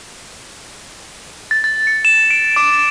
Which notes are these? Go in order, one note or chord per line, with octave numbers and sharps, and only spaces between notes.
A6
A6
C#7
E7
D7
D6